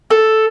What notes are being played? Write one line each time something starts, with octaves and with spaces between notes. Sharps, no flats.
A4